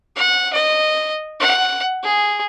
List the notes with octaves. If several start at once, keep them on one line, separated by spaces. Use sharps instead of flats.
F#5
D#5
F#5
G#4